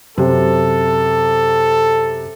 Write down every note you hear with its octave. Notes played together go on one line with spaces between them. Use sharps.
F#2 C3 A4 C5